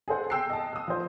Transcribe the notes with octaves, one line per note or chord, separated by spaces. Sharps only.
G#4 A4 C5 F#5
G5 E6 F#6 C7
D#5 A5
D#6 E6
F3 C5